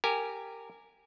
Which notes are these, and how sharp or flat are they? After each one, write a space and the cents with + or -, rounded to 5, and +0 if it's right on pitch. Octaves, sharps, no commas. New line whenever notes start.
G4 +0 A#4 -20 G#5 +0